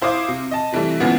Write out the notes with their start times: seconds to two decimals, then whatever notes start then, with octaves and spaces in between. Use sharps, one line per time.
0.02 E4 C5 F5 D6 D#6
0.28 C3
0.51 D#5 A5
0.72 C3 E3 G3 A3
1.00 C#3 E3 F3 G#3 B3 G#4